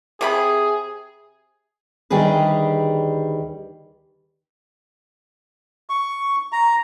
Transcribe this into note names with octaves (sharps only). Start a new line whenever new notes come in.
C3 C#4 G#4 B5
D2 D#3 G3 G4 G#4 B4
C#6
A#5